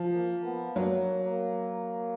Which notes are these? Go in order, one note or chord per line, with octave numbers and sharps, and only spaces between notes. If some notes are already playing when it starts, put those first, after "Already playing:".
Already playing: F3
A#3
B3
F#3 A#3
A#3